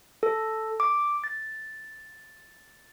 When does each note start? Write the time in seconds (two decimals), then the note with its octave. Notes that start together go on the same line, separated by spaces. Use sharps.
0.23 A4
0.80 D6
1.24 A6